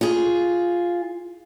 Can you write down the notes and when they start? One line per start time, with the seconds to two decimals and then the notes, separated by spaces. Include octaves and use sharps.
0.01 F4 G#4